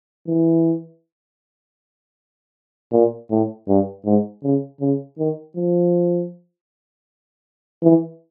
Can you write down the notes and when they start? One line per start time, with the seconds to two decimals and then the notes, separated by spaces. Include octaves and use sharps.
0.28 E3
2.92 A#2
3.30 A2
3.68 G2
4.05 G#2
4.43 C#3
4.81 C#3
5.19 D#3
5.56 F3
7.83 E3